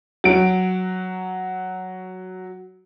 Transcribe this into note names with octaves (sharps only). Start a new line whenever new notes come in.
F#3 D7